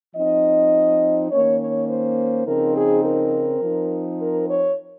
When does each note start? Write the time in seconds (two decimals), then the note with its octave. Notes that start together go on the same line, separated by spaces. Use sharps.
0.16 F3 C4 D#4 D#5
1.31 D#3 A#3 C#4 C#5
1.59 C#5
1.89 C5
2.46 C#3 F3 C4 D#4 A#4
2.75 G#4
3.03 A#4
3.61 F3 C4 D#4
4.19 A#4
4.48 C#5